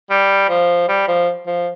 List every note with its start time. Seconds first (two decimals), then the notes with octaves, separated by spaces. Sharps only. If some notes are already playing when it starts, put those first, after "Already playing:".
0.10 G3
0.49 F3
0.88 G3
1.08 F3
1.47 F3